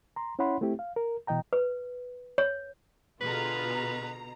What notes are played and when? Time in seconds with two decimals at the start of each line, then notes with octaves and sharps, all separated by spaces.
0.16 A#5 C6
0.39 C#4 E4 C#5 F#5 B5 C6
0.61 A3 C4 E4 G4
0.79 F5
0.96 A#4
1.27 B2 E3 D#5 G5 A#5
1.53 B4
2.38 C#5
3.21 B2 D3 F4 G#4 B4 A#5